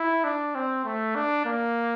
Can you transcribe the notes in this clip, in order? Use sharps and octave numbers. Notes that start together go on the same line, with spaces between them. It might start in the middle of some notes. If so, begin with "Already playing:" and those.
Already playing: E4
D4
C4
A3
D4
A#3